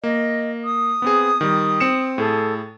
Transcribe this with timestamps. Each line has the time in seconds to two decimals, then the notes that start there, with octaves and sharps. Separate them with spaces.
0.04 A#3 D#5
0.64 D#6
1.02 B3 C4 G#4
1.41 D#3 G3
1.80 C4 C#7 E7
2.18 A2 G#4 A4